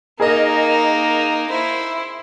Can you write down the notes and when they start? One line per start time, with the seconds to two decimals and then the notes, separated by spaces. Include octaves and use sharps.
0.20 A#3 D#4 G#4 A#4 D#5
1.50 E4 C5